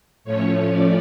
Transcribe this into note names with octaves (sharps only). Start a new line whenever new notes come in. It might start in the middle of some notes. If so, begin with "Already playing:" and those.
A2 F3 A3 C#4 C#5
D5